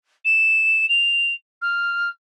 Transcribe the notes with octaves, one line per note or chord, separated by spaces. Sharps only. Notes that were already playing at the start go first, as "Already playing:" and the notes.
E7
F7
F6